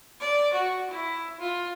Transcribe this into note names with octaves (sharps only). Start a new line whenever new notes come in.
D5
F#4
E4
F4